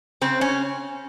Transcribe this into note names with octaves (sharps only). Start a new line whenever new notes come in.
C#3 C4
C#4